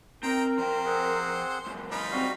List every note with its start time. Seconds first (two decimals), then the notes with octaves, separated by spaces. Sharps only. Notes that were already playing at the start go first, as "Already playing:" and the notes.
0.23 C4 D#4 A#4 G5 A#5
0.58 F3 C5 G5 A#5
0.85 C4 G#4 F#5
1.66 C#2 F#2
1.92 D#4 F4 A#4 B5
2.12 G3 C4 F#4 F5